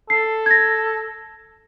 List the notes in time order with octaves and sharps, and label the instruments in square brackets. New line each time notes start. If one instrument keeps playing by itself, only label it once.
[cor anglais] A4 [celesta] C7
[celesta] G#6 A#6